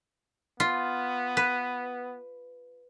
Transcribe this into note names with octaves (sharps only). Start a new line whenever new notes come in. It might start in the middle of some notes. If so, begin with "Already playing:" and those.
B3 F4
B4